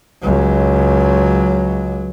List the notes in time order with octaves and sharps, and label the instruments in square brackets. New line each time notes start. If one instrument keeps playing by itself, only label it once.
[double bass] C#2 F#3